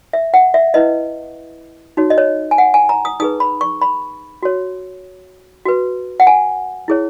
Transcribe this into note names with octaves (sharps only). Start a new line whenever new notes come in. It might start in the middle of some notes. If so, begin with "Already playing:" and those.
E5
F#5
E5
E4 B4 D#5
D#4 F#4 C#5
D#5
C#5
G#5
F#5
G#5
A#5
D#6
D#4 G#4 B4 D#6
B5
C#6
B5
F#4 C#5
F#4 B4
F#5
G#5
E4 G#4 C#5